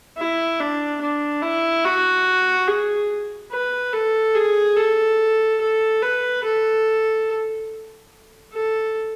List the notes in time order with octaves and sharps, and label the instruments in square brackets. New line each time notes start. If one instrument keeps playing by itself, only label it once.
[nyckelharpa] E4
D4
D4
E4
F#4
G#4
B4
A4
G#4
A4
A4
B4
A4
A4